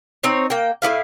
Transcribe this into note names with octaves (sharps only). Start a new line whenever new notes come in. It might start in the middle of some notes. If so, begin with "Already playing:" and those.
C4 D#4 C#5
A#3 G5
A2 B3 E4 F5